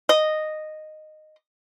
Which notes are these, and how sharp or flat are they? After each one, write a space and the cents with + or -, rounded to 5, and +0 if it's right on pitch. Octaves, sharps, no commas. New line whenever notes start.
D#5 -10